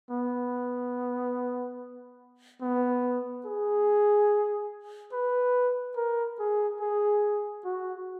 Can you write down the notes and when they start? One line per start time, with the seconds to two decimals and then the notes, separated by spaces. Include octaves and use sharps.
0.10 B3
2.61 B3
3.46 G#4
5.13 B4
5.96 A#4
6.39 G#4
6.81 G#4
7.64 F#4